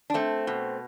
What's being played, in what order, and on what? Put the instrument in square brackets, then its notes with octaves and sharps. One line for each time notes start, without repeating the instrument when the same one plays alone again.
[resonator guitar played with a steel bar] D4
A3 C4
B2